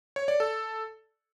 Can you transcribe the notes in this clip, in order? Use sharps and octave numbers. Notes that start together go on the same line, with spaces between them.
C#5
D5
A4